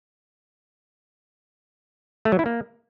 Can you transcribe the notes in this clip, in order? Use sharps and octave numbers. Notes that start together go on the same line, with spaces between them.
A3
F#3
E4
A#3